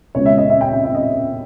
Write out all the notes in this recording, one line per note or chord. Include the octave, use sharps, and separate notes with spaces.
C#2 B2 G#3 C#5
E5
D#5
E5
G5
G5
E5
D#5